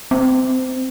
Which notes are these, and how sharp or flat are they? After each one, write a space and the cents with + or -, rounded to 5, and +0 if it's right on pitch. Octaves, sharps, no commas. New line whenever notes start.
C4 -25